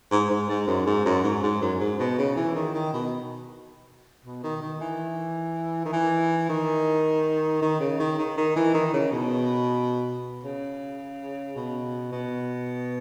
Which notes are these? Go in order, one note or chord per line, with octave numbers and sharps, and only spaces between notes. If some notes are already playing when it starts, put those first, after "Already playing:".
G#2
G#2
G#2
F#2
G#2
F#2
G#2
G#2
F#2
G#2
B2
C#3
E3
D#3
D#3
B2
B2
D#3
D#3
E3
D#3
E3
D#3
D#3
C#3
D#3
D#3
D#3
E3
D#3
C#3
B2
C#3
B2
B2